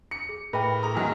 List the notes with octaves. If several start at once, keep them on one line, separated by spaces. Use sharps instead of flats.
C#7
G#4
A2 G#4 A#4 B4 E5 G5
G#4 A#5 C6 D#6
C2 D#3 F#3 F#4 G#5